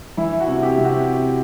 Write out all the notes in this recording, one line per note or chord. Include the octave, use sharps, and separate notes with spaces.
E3 E4
F#4
C3
G4
C3
F#4